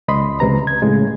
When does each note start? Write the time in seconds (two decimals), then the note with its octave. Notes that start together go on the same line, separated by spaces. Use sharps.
0.08 C#2 D#5 B5 C6
0.40 C#2 C3 B4 A#5
0.67 G#6
0.82 A2 C#3 G#3